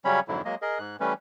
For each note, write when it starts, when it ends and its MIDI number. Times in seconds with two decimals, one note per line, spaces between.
0.05 0.20 49
0.05 0.20 54
0.05 0.20 55
0.05 0.20 61
0.05 0.20 73
0.05 0.20 83
0.28 0.42 41
0.28 0.42 44
0.28 0.42 50
0.28 0.42 54
0.28 0.42 64
0.45 0.55 54
0.45 0.55 56
0.45 0.55 58
0.45 0.55 75
0.62 0.79 68
0.62 0.79 70
0.62 0.79 75
0.79 0.96 44
0.79 0.96 90
1.00 1.14 52
1.00 1.14 55
1.00 1.14 57
1.00 1.14 61
1.00 1.14 71